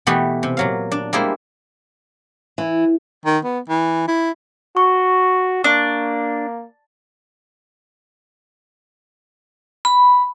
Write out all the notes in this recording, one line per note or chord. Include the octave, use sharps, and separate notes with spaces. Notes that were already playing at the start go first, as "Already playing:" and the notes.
B2 E3 A3 B3 G4
C3
A#2 F#3 F5
D4
G3 G#3 A#3 E4 G#4 C5
E3
D#3
B3
E3
E4
F#4 C#6
A#3 D4
B5